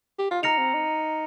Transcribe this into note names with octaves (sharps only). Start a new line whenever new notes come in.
G4
F4
D#4 A#5 F6 A#6 C#7 F7
C4
D#4